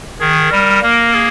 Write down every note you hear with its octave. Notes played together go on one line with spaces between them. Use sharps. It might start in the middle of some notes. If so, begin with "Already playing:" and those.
D#3 G#4
G3 A#4
A#3 A#4
G#4